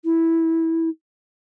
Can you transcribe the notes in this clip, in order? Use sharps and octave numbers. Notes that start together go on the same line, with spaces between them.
E4